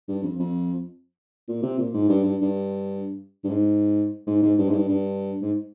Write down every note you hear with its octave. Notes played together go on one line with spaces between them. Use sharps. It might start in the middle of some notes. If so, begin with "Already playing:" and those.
G2
F2
F2
A#2
C3
A#2
G#2
G2
G2
G2
G2
G#2
G#2
G#2
G2
G#2
G2
G2
G#2